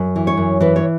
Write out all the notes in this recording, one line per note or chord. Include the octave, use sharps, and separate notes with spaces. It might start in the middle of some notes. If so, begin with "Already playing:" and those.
Already playing: F#2
E3
C#5
F#2
E3 B4
C#5